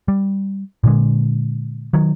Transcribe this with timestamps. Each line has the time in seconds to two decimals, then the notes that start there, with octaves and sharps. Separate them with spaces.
0.08 G3
0.84 A#2 D3 G#3
1.94 D#3 F#3